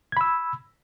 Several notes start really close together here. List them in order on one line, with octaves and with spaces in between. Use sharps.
G#6 B5 E6